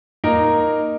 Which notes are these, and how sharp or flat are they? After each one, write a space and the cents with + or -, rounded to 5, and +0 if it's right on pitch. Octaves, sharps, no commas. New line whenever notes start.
A#3 +0 D#4 -15 A#4 +0